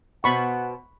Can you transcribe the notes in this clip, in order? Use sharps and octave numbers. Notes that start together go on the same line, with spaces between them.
B2 B3 C5 F#5 B5 C#6